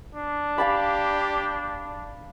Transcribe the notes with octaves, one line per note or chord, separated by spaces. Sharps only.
D4
G4 F5 A5 B5